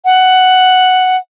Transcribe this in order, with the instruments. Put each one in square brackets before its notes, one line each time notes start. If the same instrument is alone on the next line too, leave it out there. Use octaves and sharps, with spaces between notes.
[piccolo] F#5